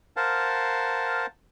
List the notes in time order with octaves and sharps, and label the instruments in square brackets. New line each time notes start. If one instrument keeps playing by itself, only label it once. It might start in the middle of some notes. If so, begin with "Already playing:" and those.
[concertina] A#4 C5 F5 F#5 A5